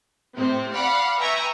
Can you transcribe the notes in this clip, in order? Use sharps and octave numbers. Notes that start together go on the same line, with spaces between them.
A2 C3 C4
D5 F5 F#5 B5
B4 E5 G5 G#5 A#5 C#6